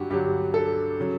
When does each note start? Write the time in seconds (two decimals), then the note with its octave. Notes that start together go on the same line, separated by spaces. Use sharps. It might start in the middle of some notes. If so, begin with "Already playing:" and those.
Already playing: G2 D3 F#3 F#4 G4
0.10 G2 D3 F#3 G4
0.54 A4
1.00 C#3 F#3